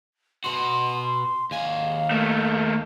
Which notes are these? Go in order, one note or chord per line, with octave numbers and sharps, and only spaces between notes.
B2 F#4 C6
D#2 F5 G#5
A3 A#3